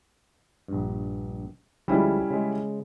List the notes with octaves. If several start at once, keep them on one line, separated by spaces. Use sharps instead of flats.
A#1 G2
D2 F3 G3 G#3 C#4 E4
C#3 G#3